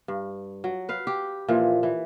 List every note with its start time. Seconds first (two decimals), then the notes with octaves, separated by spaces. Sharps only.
0.08 G2
0.64 F#3
0.89 B4 F5
1.07 G4
1.48 A#2 E3 F3
1.83 E3